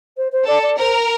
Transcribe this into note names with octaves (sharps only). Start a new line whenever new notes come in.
C5
C5
A4 D5
D5
A#4 C5